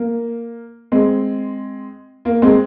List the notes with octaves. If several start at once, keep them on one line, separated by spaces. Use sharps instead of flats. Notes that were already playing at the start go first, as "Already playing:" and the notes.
Already playing: A#3
G#3 C4
A#3
G#3 C4